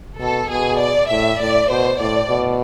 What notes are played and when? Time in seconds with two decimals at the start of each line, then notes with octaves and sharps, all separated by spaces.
0.20 B2 A4
0.50 B2 G#4
0.80 D5
1.10 A2 E5
1.41 A2 D5
1.69 B2 C5
2.00 A2 D5
2.30 B2